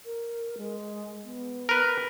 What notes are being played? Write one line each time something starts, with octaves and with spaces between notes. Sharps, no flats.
A#4
G#3
B3
A#4 B4